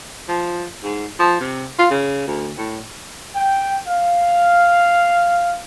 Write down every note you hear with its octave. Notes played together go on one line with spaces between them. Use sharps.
F3
G#2
F3
C3
F4
C#3
D2
A2
G5
F5